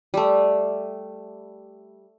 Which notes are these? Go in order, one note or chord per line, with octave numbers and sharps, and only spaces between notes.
G3 A3